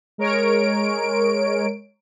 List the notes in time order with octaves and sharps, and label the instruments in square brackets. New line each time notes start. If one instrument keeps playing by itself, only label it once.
[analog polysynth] G#3 A#4 C#5 D7